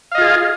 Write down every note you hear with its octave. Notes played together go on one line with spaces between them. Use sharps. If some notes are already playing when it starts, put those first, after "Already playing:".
F4 G#4 D#5 F5